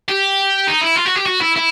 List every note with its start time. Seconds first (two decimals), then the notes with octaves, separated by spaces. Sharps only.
0.09 G4
0.67 D#4
0.81 E4
0.96 F4
1.06 F#4
1.16 G4
1.26 F#4
1.41 E4
1.56 E4